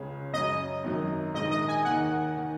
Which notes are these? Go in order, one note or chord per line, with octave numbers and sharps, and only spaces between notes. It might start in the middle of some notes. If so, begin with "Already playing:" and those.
Already playing: C#2 C#3 G#3 C#4
F#2 C#3 F#3 C#4 D#5
G#1 F#2 D#3 F#3
A#1 G#2 D#3 G#3 D#5
D#5
G#5
D#2 D#3 A#3 D#4 F#5
D#3